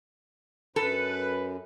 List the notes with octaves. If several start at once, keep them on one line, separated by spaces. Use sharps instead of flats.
F#2 A4 B4